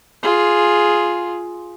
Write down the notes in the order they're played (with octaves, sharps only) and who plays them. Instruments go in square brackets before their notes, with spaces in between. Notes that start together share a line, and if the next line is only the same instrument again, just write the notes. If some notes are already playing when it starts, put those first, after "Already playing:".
[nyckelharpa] F4 G#4